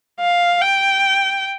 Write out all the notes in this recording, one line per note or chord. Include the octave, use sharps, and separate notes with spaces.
F5
G5